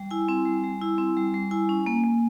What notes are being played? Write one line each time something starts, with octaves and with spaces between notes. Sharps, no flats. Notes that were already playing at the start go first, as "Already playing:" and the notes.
Already playing: G3
E4 G#5
C4
G3
G3
E4
C4
G3
G3
E4 G#5
C#4
A#3
A#3